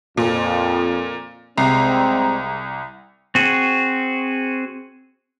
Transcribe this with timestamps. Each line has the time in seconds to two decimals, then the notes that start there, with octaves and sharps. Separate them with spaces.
0.17 F2 A#2
1.58 C2 G3 G#3 C4 A#5 C7
3.35 C4 F#4 G#4